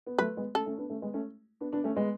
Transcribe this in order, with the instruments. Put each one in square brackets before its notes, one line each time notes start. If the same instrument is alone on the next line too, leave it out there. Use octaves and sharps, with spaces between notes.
[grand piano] B3
[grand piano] F#3 A3 [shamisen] B4
[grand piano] G#3 B3
[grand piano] A3 C#4 [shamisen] A4
[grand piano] A3 C#4
B3 D4
A3 C#4
G#3 B3
A3 C#4
B3 D4
B3 D4
A3 C#4
G#3 B3